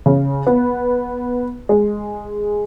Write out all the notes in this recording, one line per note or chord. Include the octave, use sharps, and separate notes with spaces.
C#3
B3
G#3